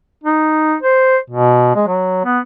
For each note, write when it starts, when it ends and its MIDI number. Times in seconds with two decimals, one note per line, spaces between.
0.24 0.76 63
0.82 1.17 72
1.30 1.72 47
1.75 1.83 56
1.87 2.23 54
2.25 2.39 59